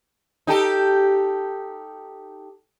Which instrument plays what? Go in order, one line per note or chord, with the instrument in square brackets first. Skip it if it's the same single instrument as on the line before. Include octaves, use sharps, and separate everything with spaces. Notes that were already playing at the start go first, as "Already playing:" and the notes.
[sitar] D#4 G4 A4